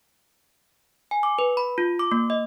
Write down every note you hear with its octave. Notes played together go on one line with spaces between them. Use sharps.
G#5
D6
B4
B5
F4
D6
A#3
D#5